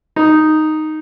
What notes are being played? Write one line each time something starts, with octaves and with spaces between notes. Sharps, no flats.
D#4